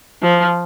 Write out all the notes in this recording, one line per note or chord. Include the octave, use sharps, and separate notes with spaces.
F3